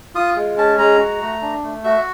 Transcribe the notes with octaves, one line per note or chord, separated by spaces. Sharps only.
F4 D#6
G#3
C#4 A5
G#3 A#5
F#4
A3
D4
A3
F#4 E5